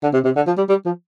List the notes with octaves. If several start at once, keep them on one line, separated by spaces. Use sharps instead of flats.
D3
C3
C3
D3
F3
G3
G3
F3